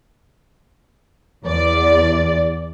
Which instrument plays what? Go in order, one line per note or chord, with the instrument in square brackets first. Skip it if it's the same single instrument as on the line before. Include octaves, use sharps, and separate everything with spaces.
[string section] E2 D5